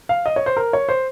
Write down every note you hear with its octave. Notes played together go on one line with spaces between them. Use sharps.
F5
D#5
C#5
C5
A#4
C#5
C5